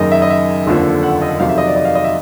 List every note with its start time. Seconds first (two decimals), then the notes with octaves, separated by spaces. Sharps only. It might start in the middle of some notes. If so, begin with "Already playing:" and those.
Already playing: F#1 F#2 D#3 D#5
0.12 E5
0.22 D#5
0.30 E5
0.66 F1 D#2 D3 F3
1.03 F#5
1.22 D#5
1.40 F2 C3 D#3 F#3 F5
1.49 E5
1.58 D#5
1.67 D5
1.76 D#5
1.85 F5
1.95 D#5
2.04 E5